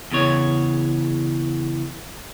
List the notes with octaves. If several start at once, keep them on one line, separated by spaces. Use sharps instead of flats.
E2 C#3 C#5